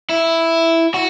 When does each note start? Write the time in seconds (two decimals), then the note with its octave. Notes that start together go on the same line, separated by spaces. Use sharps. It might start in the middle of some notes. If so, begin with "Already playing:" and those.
0.10 E4
0.94 F#4